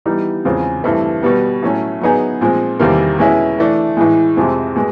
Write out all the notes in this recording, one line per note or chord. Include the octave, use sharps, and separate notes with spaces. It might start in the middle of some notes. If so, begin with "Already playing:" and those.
E3 G3 B3 D#4
E2 C#3 F3 G#3 C4
G2 E3 A3 C4
B2 G3 B3
A2 F#3 A3 C#4
F#3 B3 D#4 G#4
A#2 F3 G#3 C4
E2 C3 D#3 G3 A#3
B2 G#3 C#4 E4
E3 A3 D4
A2 E3 G#3
F2 C3 F3 G#3 C4
B2 G#3